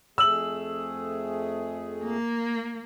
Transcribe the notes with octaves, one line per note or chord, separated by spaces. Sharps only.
F2 A3 G#4 E6 F#7
A#3